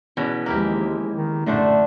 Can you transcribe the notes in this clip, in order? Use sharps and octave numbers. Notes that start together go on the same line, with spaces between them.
E2 B2 C#4
D#2 F3 G#3 A#3 E4 G4
D#3
A1 F#2 A#2 D3 A3 D4 C5